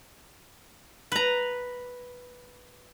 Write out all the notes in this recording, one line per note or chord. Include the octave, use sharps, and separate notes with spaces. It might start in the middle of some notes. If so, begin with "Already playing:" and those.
B4 A#5